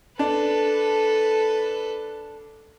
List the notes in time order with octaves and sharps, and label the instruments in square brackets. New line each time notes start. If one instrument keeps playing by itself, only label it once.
[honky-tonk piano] D4 [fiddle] A4 B4